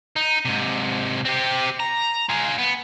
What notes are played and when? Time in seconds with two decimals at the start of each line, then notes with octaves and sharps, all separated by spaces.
0.16 D#4
0.45 G#2 C3
1.25 C4 G4
1.80 A#5
2.29 F4 G#4
2.58 B3